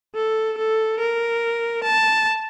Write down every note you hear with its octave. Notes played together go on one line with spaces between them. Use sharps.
A4
A4
A#4
A5